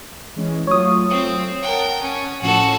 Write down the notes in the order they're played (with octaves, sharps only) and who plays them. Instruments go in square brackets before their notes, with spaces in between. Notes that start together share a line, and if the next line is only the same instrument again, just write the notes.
[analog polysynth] E3 G#3 C#4
[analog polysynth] F#3 A3 F4 [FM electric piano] C#5 D#6
[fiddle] C4
[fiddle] A#4 G5 [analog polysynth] F#5 A5
[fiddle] C#4
[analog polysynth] A2 F3 C#4 [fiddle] F#4 A4